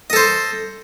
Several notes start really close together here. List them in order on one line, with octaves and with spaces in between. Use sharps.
D#5 A4 C5